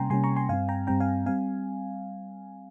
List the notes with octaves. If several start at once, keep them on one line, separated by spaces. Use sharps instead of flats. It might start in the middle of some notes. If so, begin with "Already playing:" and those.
Already playing: C3 G3 A#3 C#4 G5 G#5 A#5 C6
C3 G3 A#3 C#4 G#5 C6
A#5 C#6
G#5 C6
G2 G3 C4 F5 G#5
G5 A#5
G2 G3 C4 G5 A#5
F5 G#5
G3 C4 F5 G#5